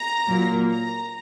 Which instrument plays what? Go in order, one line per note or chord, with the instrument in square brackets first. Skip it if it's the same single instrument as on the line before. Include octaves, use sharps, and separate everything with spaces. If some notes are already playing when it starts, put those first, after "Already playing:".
Already playing: [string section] A#5
A#2 F#3 A#3
A#5